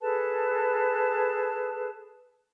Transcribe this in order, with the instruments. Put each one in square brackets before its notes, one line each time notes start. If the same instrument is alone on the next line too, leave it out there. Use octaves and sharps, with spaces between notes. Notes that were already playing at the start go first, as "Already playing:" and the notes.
[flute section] G#4 A4 B4 A5